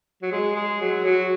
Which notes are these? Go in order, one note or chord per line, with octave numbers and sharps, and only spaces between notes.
F#3
G#3 G#4
G#3
F#3
F#3 F#4